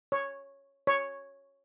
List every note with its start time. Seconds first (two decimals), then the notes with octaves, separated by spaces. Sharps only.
0.12 C#5
0.87 C#5